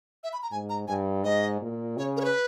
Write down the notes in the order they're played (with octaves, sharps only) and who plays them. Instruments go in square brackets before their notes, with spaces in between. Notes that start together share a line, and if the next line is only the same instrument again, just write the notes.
[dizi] E5
B5
A#5
[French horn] G#2 [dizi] G#5
[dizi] A#5
[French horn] G2 [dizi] G#5
[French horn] G#2 [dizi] D#5
[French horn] A#2
[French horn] C#3 [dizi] C#5
[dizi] A#4
C#5
B4